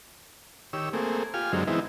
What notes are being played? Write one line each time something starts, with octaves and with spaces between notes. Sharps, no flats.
D#3 G4 C#5 E6
A3 A#3 C4 G#4
F4 G4 G#5 F6
F#2 D3 F#3 G#3 C4 D#4
E3 G#3 B3 C4 D#4 E4